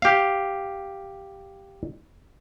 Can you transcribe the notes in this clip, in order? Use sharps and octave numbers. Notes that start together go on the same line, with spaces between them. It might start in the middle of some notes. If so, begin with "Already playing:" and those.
G4 F5